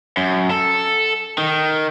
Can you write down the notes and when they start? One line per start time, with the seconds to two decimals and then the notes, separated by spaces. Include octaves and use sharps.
0.17 F#2
0.51 A4
1.38 D#3